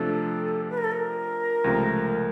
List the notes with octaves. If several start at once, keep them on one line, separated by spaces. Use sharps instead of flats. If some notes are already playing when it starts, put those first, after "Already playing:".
Already playing: C3 F3 A3 D4 A4
B4
A#4
A4
A#4
C#2 C3 F3 A3